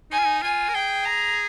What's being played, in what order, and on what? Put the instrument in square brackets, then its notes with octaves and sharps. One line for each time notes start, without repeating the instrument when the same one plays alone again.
[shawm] D#4 [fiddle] G#5
[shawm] F4
D#4
[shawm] F4 [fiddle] G#5
[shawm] A#4
[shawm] G#4 [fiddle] G5
[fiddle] A#5